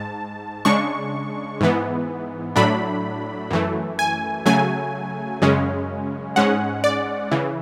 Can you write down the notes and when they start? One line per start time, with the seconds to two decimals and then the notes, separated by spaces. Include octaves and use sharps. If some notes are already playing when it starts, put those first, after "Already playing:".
Already playing: G#2 A5
0.65 C#3 G#3 D4 C#6
1.61 G#2 E3 B3
2.56 A2 F#3 A3 D4 B5
3.51 F#2 E3 A3
3.99 G#5
4.46 C#3 F#3 A3 G#5
5.42 F#2 C#3 G#3 C#4
6.36 G#2 G#3 C#4 F#5
6.84 D5
7.31 C#3 E3